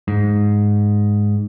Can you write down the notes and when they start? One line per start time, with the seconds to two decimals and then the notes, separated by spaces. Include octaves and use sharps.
0.08 G#2